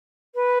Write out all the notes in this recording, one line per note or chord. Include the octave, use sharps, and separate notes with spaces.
B4